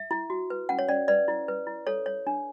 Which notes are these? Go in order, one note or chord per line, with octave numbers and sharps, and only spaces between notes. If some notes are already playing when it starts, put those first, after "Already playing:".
Already playing: E5
E4
F#4
B4
C#4 F#5
C#5
C#4 D5
B4 D5
E4
B4
E4
A4 C#5
C#5
D4